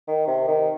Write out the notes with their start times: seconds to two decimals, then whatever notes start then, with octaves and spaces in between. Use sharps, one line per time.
0.08 D#3
0.27 C3
0.48 D#3